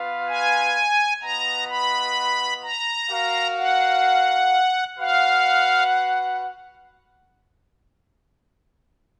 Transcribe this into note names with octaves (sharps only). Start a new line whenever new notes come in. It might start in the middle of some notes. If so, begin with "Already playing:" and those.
Already playing: B3 F4 B4 F5
G#5
B3 F4 B4 D#5 F#5 A#5
B5
A#5
F#4 A#4 F5
F#5
F#4 B4 F5 F#5